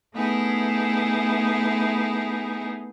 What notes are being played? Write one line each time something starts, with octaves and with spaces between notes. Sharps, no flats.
A3 B3 D#4 E4 G#4